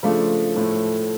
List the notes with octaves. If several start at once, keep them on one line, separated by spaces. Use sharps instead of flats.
C#3 F3 A3 D4 F4
A2 F3 A3